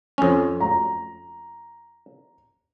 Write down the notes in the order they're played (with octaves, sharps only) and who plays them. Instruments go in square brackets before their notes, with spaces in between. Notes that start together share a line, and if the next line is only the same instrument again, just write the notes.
[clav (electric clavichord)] F2 C#4
[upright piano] A#5